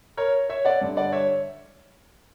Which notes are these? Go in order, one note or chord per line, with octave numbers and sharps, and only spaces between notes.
A#4 C#5
C#5 E5
D5 F#5
G2 D3
D5 F#5
C#5 E5